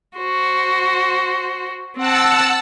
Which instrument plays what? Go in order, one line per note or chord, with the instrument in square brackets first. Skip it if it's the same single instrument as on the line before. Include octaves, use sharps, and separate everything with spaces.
[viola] F#4 C5
[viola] C4 [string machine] F#5 A5 E6